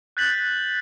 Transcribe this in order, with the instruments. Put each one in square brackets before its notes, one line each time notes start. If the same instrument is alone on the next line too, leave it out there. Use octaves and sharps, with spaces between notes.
[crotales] F#6 G6 A6 B6 F#7